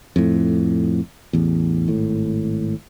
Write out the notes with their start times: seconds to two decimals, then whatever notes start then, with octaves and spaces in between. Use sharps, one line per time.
0.16 F2 A2
1.33 A1 E2
1.88 G#1 A2